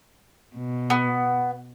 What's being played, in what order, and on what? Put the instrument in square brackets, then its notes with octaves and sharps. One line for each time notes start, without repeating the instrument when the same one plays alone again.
[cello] B2
[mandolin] B3